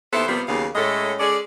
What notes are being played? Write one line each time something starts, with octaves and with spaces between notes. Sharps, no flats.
D#2 B3 E4 A4 C5
C3 F3 G3 A#3 B3
D#2 C#3 F#3 A#3 B3 F5
A2 G#3 A3 C#4 A4 D#5
G#3 C#4 G#4 A4 D5